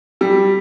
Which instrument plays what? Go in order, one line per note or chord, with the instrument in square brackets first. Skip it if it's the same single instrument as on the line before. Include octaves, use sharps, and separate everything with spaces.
[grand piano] G3